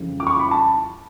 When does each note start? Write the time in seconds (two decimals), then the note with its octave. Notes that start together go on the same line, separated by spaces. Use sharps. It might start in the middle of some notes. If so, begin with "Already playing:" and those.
Already playing: F2 C#3 E3 G3
0.20 D6
0.27 C#6
0.39 B5
0.51 A5